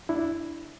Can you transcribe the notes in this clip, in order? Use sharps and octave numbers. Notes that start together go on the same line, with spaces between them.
F2 D4 E4